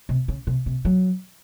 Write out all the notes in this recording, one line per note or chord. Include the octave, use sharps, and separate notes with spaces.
C3
C#3
C3
C3
F#3